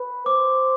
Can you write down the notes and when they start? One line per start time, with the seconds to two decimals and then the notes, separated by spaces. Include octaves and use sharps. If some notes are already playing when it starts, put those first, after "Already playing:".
Already playing: B4
0.26 C5 D6